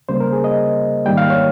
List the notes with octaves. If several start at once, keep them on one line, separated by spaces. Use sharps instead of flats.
C#2 C#3 G3 A#3 C5
A#4
G#4
D#5
G#2 D#3 G3 A#3 G5
F5
C#5